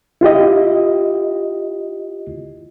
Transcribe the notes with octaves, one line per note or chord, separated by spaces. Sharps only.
E4 F4 G4 D#5